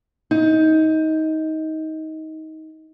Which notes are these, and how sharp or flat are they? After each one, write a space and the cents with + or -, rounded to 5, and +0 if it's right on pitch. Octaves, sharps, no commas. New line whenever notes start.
D#4 +20